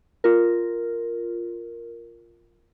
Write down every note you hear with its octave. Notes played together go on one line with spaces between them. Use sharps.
F4 A#4